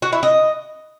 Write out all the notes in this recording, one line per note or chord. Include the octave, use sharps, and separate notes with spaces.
F#4
E4
D#5